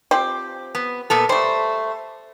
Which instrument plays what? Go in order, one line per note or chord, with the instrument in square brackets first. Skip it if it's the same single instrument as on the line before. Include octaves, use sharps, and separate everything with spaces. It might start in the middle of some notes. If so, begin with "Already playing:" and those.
[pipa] F3 C4 G4
[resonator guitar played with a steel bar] B3
A#2 B3 A4
[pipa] G3 A3 [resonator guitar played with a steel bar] C5